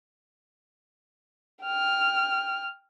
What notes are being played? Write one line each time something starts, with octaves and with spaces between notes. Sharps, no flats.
G5 F6